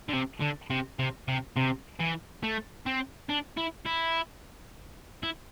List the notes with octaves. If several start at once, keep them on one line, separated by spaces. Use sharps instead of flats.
D3
C3
D3
C3
C3
C3
C3
E3
A3
C4
D4
E4
E4
E4